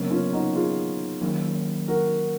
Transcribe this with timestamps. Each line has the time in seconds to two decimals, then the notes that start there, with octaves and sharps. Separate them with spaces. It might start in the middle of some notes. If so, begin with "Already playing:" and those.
Already playing: C#3 F#3 A#3 B3 C#4
0.11 C#4 F4
0.33 D#4 F#4
0.55 F4 G#4
1.21 D#3 F#3 A#3 C#4
1.88 F#4 A#4